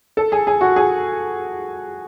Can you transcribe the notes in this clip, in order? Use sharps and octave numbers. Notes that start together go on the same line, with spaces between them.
A4
G#4
G#4
F#4
G#4